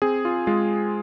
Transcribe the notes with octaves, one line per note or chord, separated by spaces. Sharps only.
C4 G#4
F4
G#3 F4